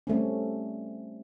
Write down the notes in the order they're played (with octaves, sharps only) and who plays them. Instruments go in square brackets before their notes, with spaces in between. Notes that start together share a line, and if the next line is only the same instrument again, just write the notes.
[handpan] G3 A3 C4 C#4